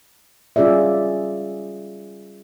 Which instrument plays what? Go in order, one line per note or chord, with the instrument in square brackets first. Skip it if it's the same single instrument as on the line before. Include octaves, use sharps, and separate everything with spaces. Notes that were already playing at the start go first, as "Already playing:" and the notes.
[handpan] G3 C#4 F4 G#4 D5 E5